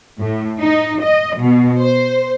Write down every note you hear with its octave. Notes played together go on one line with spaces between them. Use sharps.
A2
D#4
D#5
B2
C5